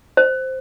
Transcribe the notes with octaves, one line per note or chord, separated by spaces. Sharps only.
C5